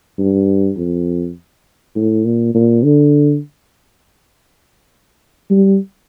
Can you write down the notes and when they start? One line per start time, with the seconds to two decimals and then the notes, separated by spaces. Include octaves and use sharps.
0.18 G2
0.77 F2
1.96 A2
2.25 A#2
2.54 A#2
2.84 D3
5.50 G3